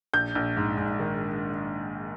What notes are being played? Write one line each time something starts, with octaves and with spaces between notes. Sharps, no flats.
A#1 G6
A#1
G#2
G#2
D#3